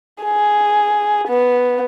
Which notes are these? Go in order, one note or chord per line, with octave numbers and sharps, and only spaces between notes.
G#4
B3